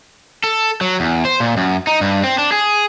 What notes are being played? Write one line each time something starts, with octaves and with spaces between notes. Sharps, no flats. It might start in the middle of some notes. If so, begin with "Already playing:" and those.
A4
F#3
E2
C5
A#2
F#2
D#4
G2
C4
D4
G#4